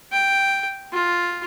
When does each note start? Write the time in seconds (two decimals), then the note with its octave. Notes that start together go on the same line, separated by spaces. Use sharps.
0.12 G5
0.93 F4